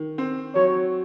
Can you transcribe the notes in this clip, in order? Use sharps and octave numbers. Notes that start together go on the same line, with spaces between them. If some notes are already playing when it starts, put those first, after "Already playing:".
Already playing: D#3
C4
F#3 C#5